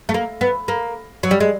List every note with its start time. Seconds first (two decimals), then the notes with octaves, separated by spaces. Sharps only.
0.09 A3
0.14 A#3
0.41 B3
0.68 A#3
1.23 F#3
1.31 G3
1.40 G#3